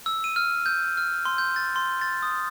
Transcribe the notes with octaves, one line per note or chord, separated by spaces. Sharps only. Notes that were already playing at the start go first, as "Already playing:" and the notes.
E6
D#7
F6
G6
F6
C6
G6
A6
C6
A6
D#6